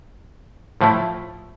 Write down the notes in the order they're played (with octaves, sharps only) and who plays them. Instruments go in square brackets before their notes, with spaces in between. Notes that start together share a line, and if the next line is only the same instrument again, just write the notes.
[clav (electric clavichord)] A2 F3 A3 E4